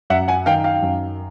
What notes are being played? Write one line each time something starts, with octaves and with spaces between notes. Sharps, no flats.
F#2 E5 F#5
F#5 G#5
D#3 F5 G5
F5 G5
F#2